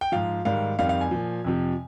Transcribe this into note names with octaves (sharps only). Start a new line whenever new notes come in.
G5
G#2 F3 F5
G#2 D#3 G3 F5
F2 D#3 G3 F5
F5
G#5
A#2 F3
F2 C3 F3